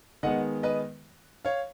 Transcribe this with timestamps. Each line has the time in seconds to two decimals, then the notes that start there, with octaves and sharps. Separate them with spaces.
0.23 D#3 G#3 B3 D#5 F#5
0.63 B4 D#5
1.45 C#5 F5